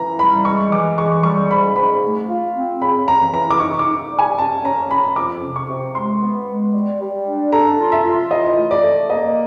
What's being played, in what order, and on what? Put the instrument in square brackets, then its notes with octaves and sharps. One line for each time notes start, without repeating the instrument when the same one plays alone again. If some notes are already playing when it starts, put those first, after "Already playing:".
Already playing: [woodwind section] E3 [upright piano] A#5
[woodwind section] G3 [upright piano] B5
[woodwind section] G#3 [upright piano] C#6
[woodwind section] E3 [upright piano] D6
[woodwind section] G#3 [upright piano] C#6
[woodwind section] G3 [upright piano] C#6
[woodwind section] G#2 [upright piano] B5
[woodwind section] G#2 [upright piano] B5
[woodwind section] A3
F4
C4
[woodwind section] C#3 [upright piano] B5
[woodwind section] E3 [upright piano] A#5
[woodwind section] E3 [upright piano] A#5
[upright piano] D6
[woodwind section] D#4 [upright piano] C#6
[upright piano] D6
[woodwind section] D#4
G3
[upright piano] G#5
[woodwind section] C#4 [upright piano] A5
[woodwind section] C#4 [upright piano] A#5
[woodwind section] C#4 [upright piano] B5
[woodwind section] F2 [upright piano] D6
[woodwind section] C3
[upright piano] C#6
[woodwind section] C3
[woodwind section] G#3 [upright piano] C6
[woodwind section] B3
G#3
G3
G3
D4
[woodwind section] A4 [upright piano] A#5
[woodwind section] F4
[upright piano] E5
[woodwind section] F4
[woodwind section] E3 [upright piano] D#5
[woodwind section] A3
[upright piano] D5
[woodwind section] A3
[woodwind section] A#3 [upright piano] D#5